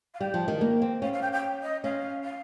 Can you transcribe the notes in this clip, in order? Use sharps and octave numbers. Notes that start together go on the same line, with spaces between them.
F5
G3 G5
F3
D#3
A#3
C4
C#4 F5
F5
G5
G5
D#5
C#4 F5
F5